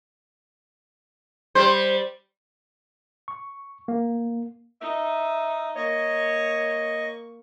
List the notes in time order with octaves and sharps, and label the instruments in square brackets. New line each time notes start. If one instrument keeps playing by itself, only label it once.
[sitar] G3 C5
[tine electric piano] C#6
A#3
[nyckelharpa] D#4 [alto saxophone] E5
[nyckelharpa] A#3 C#6 [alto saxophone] C#5 [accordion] D#5